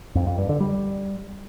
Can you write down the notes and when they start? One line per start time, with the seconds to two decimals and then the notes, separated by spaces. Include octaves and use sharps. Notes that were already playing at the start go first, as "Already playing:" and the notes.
0.15 F2
0.27 F2
0.38 G2
0.49 D3
0.60 G3